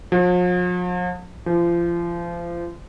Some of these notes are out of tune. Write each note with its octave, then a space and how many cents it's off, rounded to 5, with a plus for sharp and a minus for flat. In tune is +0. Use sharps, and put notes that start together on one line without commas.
F3 +45
F3 -30